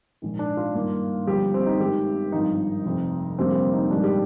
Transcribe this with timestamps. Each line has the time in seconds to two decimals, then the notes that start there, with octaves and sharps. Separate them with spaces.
0.22 A#1 G#2 D#3
0.39 D4
0.57 F4
0.75 G2 D#3 A#3
1.27 G1 G2 F3 G4
1.54 C4
1.66 D#4
1.79 G#1 G#2 D#3 G4
2.32 G#1 G2 F3 D#4
2.85 F1 F2 C3
3.38 F1 F2 D3 G3 A#3 C4
3.55 C4
3.73 D#4
3.91 A#1 G#2 D#3 G3 D4
4.04 G4